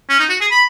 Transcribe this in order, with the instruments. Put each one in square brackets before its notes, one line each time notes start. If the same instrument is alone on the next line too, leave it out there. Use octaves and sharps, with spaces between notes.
[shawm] C#4
D#4
F#4
G#4
B5